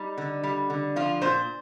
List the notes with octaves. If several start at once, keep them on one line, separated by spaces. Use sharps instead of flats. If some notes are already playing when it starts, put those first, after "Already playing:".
Already playing: G3 D#4
D3
G3
D3
F3 F4
A#2 C5